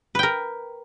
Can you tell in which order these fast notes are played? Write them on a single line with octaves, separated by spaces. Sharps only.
B4 G5 A#4